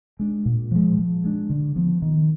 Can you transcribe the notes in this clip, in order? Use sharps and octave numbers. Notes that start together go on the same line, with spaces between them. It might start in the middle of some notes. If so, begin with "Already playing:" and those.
G#3 D4
A#2
F3 G#3
F3
G#3 D4
D3
F3 B3
D#3